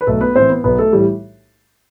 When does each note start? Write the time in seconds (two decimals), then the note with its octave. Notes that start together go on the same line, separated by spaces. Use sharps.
0.01 B4
0.07 B1 A3 A4
0.21 B3 B4
0.35 A2 E3 C4 C5
0.50 B3 B4
0.64 B1 B3 B4
0.79 A3 A4
0.92 A2 E3 G3 G4